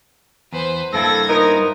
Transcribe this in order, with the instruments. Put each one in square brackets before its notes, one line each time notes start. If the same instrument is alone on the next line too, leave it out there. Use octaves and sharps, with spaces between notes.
[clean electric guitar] E2 [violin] B4 C5
[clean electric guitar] G2 A#3 E4 [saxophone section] A4 [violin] G#6 A#6
[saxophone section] F3 B3 D#4 [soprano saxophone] A#4